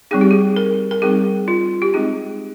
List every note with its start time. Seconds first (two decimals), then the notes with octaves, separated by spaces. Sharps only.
0.11 G3 C4 D#4 G#4
0.21 G4
0.31 G#4
0.56 A#4
0.91 A#4
1.02 G3 C4 D#4 G#4
1.48 F4
1.82 G4
1.94 G#3 C4 D#4 G#4